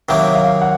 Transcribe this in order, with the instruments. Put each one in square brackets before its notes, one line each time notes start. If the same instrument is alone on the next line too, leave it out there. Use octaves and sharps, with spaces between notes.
[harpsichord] C3 D#3 F#3 A#3 [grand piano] E5
[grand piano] F5
F#5